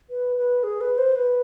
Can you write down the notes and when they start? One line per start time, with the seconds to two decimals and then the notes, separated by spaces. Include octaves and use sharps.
0.10 B4
0.37 B4
0.63 G#4
0.81 B4
0.98 C5
1.16 B4